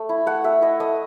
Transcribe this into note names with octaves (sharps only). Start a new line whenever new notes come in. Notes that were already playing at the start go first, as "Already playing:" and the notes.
Already playing: A3
E4
A3 F#5
A3 E5
E4 D#5
A3 D#5